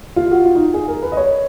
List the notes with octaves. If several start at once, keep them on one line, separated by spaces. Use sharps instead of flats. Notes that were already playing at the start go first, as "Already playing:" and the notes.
F4
F#4
F4
D#4
G#4
A#4
B4
D#5
C#5